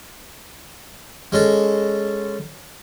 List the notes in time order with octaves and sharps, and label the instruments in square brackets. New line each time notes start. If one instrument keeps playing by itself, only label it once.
[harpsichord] G#3 C#4 A4